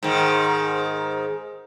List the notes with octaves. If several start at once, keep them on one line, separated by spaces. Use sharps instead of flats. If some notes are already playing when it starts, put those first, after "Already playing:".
G#2 D#3